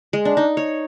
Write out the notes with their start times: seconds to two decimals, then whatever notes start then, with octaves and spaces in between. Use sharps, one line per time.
0.13 G#3
0.25 D4
0.37 D#4
0.57 C#5